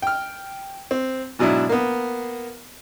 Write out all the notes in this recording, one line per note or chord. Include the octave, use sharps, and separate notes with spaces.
G5 F6
C4
G#2 B2 F#3 D4 E4
A#3 B3